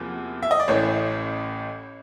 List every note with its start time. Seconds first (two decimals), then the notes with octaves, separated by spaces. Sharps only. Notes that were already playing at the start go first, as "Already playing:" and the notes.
Already playing: E2 C3 F3 A#3
0.43 E5
0.51 D#5
0.60 D5
0.68 A1 A2 E3 C#5